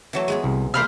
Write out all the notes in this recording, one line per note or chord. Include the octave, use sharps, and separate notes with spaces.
E3 F#3 A3
G#3 B3 G#4
C2
C3 A#3 C5 B5 F6